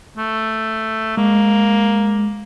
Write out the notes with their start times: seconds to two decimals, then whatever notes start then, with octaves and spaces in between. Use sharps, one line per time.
0.18 A3
1.17 G#3 A#3